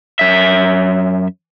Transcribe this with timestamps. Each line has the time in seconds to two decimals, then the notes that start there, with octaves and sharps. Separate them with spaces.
0.19 F#2 E5